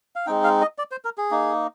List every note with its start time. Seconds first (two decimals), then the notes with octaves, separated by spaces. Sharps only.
0.16 F5
0.26 G#3 C4 D#4 G5
0.44 F5
0.61 D#5
0.78 D5
0.91 C5
1.05 A#4
1.18 G#4
1.31 A#3 D#4